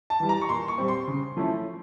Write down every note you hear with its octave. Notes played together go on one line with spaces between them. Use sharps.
A5
E3 G3
A#5
C#6
A#2 C6
C#6
G3 C4
C6
C#3
F3 A3 C#4 E4